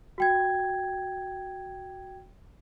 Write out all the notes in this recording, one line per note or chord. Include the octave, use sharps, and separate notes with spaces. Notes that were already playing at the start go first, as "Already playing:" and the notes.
F#4 G5 G#6